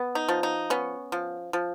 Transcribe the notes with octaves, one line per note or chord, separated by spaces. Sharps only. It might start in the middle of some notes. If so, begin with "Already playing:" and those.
Already playing: B3
D#4
F3
D#4
B3 C#4
F3
F3